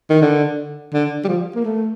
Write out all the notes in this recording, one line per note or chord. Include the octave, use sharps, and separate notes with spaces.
D#3
D3
D3
G3
F3
A#3
A3